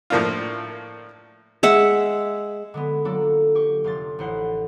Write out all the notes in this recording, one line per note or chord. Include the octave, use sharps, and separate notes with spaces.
A2 F3 A#3 D4 F4
G#3 E5 F#5
D3 G#3 B3
F#3 A#3 D4 F4 A4
G4 C#6
F1 F4 C6 A6
A1 C5 F#5 C7